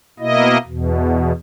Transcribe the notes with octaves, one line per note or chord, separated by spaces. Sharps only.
B2 A#3 E4 D#5
E2 B2